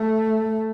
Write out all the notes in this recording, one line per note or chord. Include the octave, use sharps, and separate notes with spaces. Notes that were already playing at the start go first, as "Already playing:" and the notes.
Already playing: A3